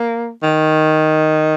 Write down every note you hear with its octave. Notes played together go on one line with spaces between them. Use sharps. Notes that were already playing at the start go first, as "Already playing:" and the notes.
Already playing: A#3
D#3